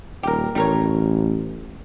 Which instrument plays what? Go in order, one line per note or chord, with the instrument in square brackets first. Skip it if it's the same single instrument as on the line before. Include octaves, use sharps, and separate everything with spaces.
[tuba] D#1 [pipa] G4 A#4
[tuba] A1 [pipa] G3 A#4 C#5